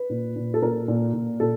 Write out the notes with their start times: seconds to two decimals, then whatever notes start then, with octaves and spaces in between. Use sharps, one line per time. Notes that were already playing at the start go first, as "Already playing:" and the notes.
Already playing: B4
0.10 A#2
0.36 A#2
0.54 A4
0.62 A#2 A#4
0.88 A#2
1.13 A#2
1.40 A#2 A4